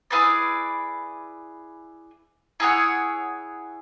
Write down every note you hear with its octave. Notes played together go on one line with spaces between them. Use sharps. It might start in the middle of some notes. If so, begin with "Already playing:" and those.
E4 G#4 B4 D5
E4 G#4 C#5 F#5